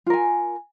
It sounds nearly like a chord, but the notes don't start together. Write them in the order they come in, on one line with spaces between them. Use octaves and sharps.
F4 A#4 G#5